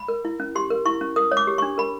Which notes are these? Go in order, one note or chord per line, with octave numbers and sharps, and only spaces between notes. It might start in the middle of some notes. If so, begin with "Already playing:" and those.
Already playing: B5
A#4
E4
C#4
G4 C6
A#4
E4 C#6
C#4
A#4 D#6
C#5
D6
G4
D4 C#6
A#4 B5